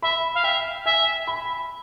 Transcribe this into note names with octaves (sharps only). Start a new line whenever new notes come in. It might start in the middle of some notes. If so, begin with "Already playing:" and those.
E5 B5
F5
E5 G5
E5 G#5
B5